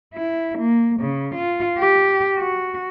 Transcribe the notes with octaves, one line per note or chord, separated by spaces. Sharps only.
E4
A#3
C#3
F4
G4
F#4